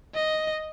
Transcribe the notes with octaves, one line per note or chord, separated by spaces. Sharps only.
D#5